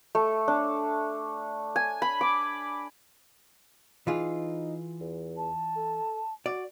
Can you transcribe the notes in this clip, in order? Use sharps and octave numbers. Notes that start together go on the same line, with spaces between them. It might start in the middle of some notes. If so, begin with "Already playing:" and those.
A3
D4
G#5
B5
D6
E3 D#4 F4 G#4
E2
A5
A4
F#4 D5